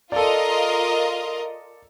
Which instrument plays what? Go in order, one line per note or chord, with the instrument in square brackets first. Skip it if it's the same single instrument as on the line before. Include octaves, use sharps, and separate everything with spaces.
[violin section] F4 A#4 D#5 [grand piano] A4 D5